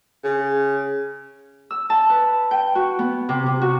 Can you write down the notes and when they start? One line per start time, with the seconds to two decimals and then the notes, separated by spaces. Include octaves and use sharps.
0.24 C#3
1.71 E6
1.90 A5
2.10 B4
2.51 G5
2.75 F#4
2.99 B3
3.29 C3
3.46 C3
3.61 F#4